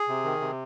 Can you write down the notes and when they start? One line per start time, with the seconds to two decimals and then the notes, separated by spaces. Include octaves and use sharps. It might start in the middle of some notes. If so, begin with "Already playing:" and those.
Already playing: G#4
0.08 C3
0.24 D#3
0.41 C3